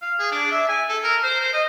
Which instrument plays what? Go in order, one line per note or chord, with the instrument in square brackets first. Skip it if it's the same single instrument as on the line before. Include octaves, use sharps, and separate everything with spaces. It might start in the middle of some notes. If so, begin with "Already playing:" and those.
[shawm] F5
G#4
D4
E5
G#5
A4
A#4
C5
C5
D#5